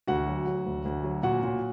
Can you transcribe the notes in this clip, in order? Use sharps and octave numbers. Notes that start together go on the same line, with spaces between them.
D2 F#4 F#5
F#3
F#3
D2
D2
F#3
A#2 F#4 F#5
A#2